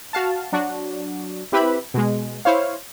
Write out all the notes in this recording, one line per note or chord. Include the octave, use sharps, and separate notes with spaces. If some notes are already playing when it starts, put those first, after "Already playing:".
F#4 F5 A5
F#3 D4 F#4
C4 E4 G4 B4 E5 B5
B2 G#3
E4 C5 C#5 F5